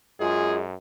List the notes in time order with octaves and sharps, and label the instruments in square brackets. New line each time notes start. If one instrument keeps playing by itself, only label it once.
[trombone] F#2 [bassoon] G#3 [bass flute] F4 [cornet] G#4